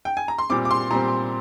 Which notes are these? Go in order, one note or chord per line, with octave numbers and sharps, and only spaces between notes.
G5
G#5
A#5
C6
A#2 G3 C4 D6
D6
C6
A#2 G3 C4 A#5